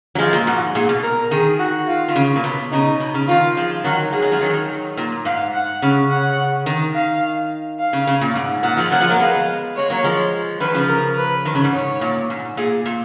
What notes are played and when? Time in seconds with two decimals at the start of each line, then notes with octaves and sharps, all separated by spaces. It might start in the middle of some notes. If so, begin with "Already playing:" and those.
0.15 F#3
0.18 F3 G#3 F4
0.33 A#2
0.47 G#2 F#4
0.75 A#2 G#4
0.89 B2
1.03 A#4
1.31 D#3 G#4
1.59 F#4
1.88 F4
2.08 D#3
2.16 C#3
2.36 A#2
2.44 B2
2.72 C#3 D#4
3.00 B2
3.14 C#3
3.28 D#3 F4
3.57 F3 G#3
3.84 D#3 F#3 F#4
4.12 G#3 G#4
4.22 F#3
4.32 F3 G#3
4.41 D#3 F#3
4.97 A#2
5.25 G#2 F5
5.53 F#5
5.82 C#3
6.10 F#5
6.66 D#3
6.95 F5
7.79 F5
7.93 C#3
8.07 C#3
8.21 A#2
8.35 G#2
8.63 A#2 F#5
8.77 F3 G#3
8.91 F#3 A#3 F#5
9.01 F3 G#3
9.10 F#3 A#3
9.20 G#3 B3 F5
9.76 G#3 C#5
9.90 F#3 A#3
10.04 F3 G#3
10.60 D#3 F#3 B4
10.74 C#3 F3
10.89 A#4
11.17 B4
11.45 D#3
11.55 C#3
11.64 G#2
11.73 C#5
12.01 A#2
12.30 G#2
12.57 A#2 G#4
12.86 A#2